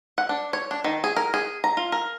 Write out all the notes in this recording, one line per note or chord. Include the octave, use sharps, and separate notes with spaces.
F#5
D4
C#5
D4
D#3
G#4
A#4
G#4
A#5
F4
A#4